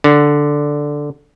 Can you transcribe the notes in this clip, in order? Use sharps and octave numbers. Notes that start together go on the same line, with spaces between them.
D3